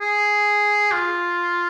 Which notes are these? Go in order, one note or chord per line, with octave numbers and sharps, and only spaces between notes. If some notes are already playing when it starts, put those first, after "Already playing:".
G#4
F4